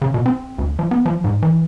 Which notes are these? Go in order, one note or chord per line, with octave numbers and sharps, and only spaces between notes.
C#3
B2
C4
D2
F3
B3
F3
G#2
E3